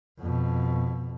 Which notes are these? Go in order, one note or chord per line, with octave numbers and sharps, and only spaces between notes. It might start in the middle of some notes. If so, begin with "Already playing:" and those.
F2 B2